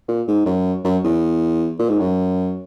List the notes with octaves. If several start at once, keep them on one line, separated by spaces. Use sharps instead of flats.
A#2
G#2
F#2
F#2
E2
A#2
G#2
F#2